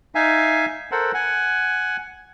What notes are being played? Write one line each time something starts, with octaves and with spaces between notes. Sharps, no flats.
D#4 E5 F5 G#5
A4 A#4 C5 F#5
F#5 G#5